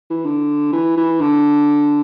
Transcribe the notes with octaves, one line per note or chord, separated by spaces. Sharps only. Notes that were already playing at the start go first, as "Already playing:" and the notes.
E3
D3
E3
E3
D3